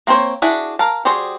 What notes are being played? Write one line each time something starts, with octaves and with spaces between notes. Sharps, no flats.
A#3 C4 A4 C5 C#5
D4 E4 F#4 G#4 D5
A#4 F5 A5
G3 F#4 G#4 C5 D5